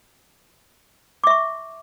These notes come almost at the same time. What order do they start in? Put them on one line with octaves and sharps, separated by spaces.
D6 E5 C#6